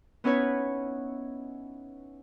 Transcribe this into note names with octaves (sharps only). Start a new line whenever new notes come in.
B3 C#4 D#4 E4 B4 C#5